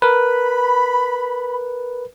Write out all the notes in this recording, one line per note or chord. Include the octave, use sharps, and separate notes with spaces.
A#4 B4 B5